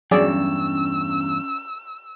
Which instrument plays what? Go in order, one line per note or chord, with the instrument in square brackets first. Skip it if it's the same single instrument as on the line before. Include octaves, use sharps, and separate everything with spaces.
[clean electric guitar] E2 G2 [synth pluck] F#3 G#4 D5 [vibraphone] C#4 [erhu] E6